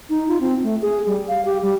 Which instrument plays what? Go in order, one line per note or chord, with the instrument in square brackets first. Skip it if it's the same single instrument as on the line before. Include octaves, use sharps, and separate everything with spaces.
[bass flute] D#4
F4
C4
A3
G#4
G3
F5
G4
G3